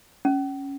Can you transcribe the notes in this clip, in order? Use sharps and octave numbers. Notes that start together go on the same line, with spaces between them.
C#4